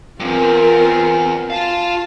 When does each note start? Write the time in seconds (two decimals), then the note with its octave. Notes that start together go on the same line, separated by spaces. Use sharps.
0.20 E2 G2 C4 F4 A#4
1.50 F4 F5 A5